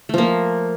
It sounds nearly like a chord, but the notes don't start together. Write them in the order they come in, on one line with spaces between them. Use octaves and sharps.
A3 F3 A#3